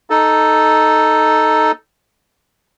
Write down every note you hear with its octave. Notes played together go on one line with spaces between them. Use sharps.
D#4 A4